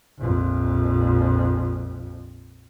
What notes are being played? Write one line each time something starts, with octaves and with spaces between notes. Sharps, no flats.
A#1 F2